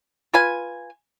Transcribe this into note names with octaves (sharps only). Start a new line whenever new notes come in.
F4 B4 G#5